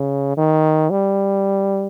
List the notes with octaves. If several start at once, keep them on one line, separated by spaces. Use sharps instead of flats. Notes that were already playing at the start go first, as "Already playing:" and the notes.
Already playing: C#3
D#3
G3